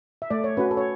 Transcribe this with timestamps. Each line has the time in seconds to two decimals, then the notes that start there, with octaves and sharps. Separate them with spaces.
0.22 E5
0.30 A3 D5
0.44 C#5
0.57 C#4 F#4 B4
0.71 A4
0.77 C#5